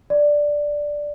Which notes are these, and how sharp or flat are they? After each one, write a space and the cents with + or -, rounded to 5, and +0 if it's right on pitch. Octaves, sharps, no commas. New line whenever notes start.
D5 +0